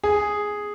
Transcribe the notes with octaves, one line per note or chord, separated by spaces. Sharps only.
G#4